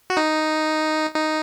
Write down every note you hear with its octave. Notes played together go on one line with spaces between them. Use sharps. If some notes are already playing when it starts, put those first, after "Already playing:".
F#4
D#4
D#4